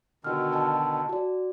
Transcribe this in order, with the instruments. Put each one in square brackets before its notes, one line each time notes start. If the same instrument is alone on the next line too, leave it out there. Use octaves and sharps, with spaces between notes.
[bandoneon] B2 D3 D#3 [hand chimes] F#4 F6
[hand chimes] G#5 A5
F#4 D5